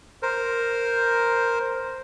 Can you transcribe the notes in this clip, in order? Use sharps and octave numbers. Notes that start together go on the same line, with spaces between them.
A#4 C5